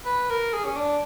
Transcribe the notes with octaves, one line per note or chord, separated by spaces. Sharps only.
B4
A#4
G#4
C#4
D4